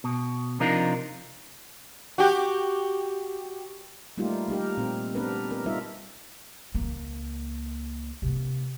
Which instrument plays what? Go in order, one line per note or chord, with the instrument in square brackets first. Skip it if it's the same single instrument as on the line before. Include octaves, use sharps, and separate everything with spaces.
[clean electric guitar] B2
C3 F3 D4 D#4 F4 A#4
[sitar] F#4 G4
[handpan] G3 A3 A#3 D#4 F4 G4
A#3 D#4 G4 A#4
A#2 C4
B3 C4 D4 G4 A#4 B4
A#4
G3 D#4 F4 A#4 E5
[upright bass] C#2 A#3
C3 A#3